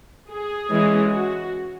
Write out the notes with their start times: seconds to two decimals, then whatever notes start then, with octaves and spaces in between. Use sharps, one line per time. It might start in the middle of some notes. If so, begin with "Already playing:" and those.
0.30 G#4
0.70 E3 G#3 C#4
1.11 F#4